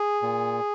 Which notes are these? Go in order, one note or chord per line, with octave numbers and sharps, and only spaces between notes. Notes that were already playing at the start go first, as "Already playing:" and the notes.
Already playing: G#4
A#2